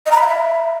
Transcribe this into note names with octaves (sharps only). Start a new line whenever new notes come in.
D#5
A#5
B5
F5
E5